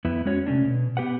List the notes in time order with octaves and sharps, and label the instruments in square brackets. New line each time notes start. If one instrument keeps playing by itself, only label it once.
[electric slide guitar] F2 B3 E4
G#3 C#4 F#4 C#5
C3 A3 C#4 D4
B2
B3 G4 B4 F#5